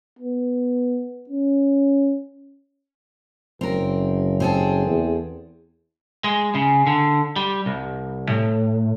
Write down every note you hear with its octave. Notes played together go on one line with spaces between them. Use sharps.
B3
C#4
F#1 C4 A#4
C4 G#4 A4
E2
G#3
C#3
D3
G3
C2
A2